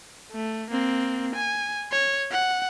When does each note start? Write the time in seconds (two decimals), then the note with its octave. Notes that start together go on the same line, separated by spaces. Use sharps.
0.32 A3
0.71 A#3 C4
1.35 G#5
1.91 C#5
2.32 F#5